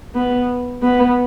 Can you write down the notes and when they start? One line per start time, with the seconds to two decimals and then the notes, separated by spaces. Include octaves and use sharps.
0.15 B3
0.82 B3